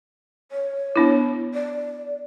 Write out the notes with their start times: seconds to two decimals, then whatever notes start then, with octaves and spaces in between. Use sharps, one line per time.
0.52 C#5
0.96 B3 D4 E4
1.54 D5